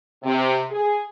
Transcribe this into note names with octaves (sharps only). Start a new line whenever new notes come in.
C3
G#4